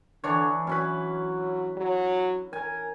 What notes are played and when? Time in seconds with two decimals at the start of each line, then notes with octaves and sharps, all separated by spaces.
0.24 D3 E3 D4 C#5
0.67 F#3 C#4 E4 B4
1.77 F#3
2.53 A#4 G#5